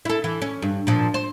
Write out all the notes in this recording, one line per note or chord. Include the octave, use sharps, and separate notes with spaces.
E4 A4
E3
C#4
G2
A#2 F3
C5